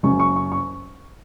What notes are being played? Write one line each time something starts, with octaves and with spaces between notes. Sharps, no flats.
F#1 F#2 C#3 C#6
C#6
C#6
C#6